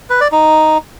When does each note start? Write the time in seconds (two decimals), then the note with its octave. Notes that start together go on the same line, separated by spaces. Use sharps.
0.10 B4
0.21 D5
0.32 D#4